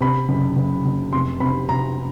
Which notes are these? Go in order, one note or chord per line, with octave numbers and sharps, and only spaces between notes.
C3 B5
F#1
F#1
F#1
F1 C6
C3 B5
C3 A#5